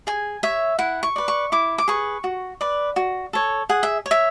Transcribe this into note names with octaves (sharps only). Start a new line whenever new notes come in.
G#4 G#5
C#5 E5
E4 F#5
C#6
B4 D5
C#6
E4 D6
D6
G#4 B4 C#6
F#4
B4 D5
F#4
A4 C#5
G#4 F#5
E5
C#5
E5